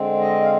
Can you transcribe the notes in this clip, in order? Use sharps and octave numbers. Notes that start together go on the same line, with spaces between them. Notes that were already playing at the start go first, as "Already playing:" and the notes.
Already playing: D3 G#3 C4
D#5
F5